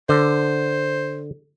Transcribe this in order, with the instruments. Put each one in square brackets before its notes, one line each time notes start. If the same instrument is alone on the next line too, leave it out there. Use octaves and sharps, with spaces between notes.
[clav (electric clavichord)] D3 [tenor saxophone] C5